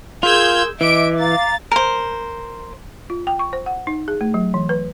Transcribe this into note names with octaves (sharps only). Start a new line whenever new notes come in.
F4 G#4 A#4 C6 E6 G6 G#6
E3 D#5 E5 D6 D7
F5 A#5 D6 A6
A#4 C5
F4
G5
C#6
C5
F#5
D#4
G#4
A3
F#3
E3
B4